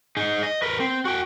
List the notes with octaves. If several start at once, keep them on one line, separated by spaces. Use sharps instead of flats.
D#4 G#4
D#5
A#4 B4
C4
F#4 G5